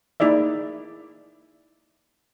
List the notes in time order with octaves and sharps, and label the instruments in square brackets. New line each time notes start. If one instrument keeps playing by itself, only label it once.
[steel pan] A#3 D#4 E4 G#4 D5 E5